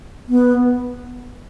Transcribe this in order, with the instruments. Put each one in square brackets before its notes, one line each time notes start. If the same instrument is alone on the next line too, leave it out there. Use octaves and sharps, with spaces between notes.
[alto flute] B3